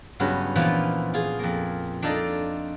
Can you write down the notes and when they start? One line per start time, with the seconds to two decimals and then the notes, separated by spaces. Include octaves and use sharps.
0.20 G2 C#3 F#3 B3 C#4
0.56 A#2 E3 F3 B3 F4
1.14 F4 G#4
1.39 F2 A#3
2.03 D4 D#4 F4 A4 D5 D#5